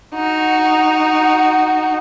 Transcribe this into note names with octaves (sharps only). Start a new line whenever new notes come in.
D#4 F#4